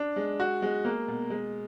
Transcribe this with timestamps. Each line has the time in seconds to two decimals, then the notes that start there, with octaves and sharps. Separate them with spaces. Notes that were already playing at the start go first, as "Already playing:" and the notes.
Already playing: D4
0.16 G#3
0.40 F#4
0.62 G#3
0.85 A#3
1.08 B2
1.30 G#3